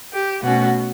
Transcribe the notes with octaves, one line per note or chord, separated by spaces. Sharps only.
G4
B2 A3 C#4 F#4